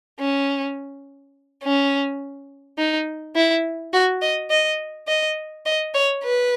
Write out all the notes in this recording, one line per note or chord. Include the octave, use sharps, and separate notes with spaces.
C#4
C#4
D#4
E4
F#4
D#5
D#5
D#5
D#5
C#5
B4